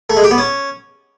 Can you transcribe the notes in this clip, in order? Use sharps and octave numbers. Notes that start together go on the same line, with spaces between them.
A3
G#3
G4
B3
C#4